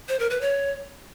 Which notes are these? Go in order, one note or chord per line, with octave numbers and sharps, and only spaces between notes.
C5
A#4
B4
C#5